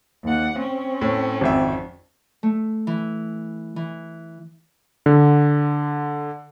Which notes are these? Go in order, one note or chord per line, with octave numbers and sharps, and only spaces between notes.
D#2 F#5
C4 C#4
A2
G#1 F2 E5
A3
E3
E3
D3